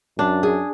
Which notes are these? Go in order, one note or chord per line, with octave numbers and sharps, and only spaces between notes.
F#2 D4
G#4